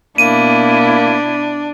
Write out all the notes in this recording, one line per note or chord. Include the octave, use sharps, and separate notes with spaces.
B2 A#3 D4 E4 D#7